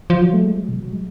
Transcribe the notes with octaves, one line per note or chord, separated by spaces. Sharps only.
F3
F#3
A3
G#3
F#3
B2
F#3
G#3